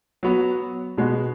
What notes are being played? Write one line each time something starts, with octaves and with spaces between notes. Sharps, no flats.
F#3 B3 F#4
B2 G#3 B3 F#4